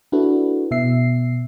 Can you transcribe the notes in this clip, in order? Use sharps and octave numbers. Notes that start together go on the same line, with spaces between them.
D4 E4 F#4 A4 B4
B2 E5 C7